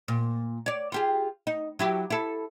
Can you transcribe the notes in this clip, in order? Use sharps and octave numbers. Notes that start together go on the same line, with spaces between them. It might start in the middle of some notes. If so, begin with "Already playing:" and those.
A#2
C#5 D5
F4 G4 G#4
D#4
F#3 E4 G4
E4 A4